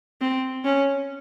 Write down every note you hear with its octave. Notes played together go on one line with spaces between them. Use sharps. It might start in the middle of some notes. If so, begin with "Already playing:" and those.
C4
C#4